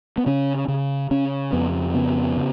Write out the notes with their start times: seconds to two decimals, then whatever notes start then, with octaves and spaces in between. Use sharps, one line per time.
0.18 B3
0.26 C#3 C#4
0.68 C#3
1.11 C#3 C#4
1.53 F2 B3
1.94 C#3 B3
2.36 C#3